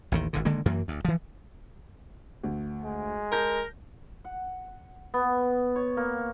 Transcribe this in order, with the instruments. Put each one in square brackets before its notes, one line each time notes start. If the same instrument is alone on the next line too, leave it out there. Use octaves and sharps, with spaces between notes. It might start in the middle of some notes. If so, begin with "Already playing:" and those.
[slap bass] A1 D#2 D#3
G#1 G#2 D3
D3 D#3 G#3 A#3
F#2 E3 A#3
D2
E3 F3
[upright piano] D2
[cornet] G#3
[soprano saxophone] A#4 [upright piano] A5 G6 A#6
[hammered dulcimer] F#5
B3
C#5
A#3